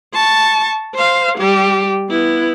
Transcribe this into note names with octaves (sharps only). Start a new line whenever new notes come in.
A5 C#6
C5 F5
G3 G4
B3 E4